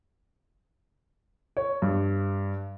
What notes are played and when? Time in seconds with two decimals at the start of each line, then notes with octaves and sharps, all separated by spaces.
1.57 C#5
1.82 G2